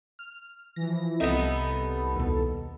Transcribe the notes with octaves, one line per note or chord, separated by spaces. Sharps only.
F6
E3 F3 A#6
C2 B3 C4 D#4 A4 D#5 E5
D#2 B2